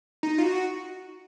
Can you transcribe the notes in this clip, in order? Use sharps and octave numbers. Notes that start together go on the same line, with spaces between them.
D#4
F4
F#4